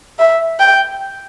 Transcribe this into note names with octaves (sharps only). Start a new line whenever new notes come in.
E5
G5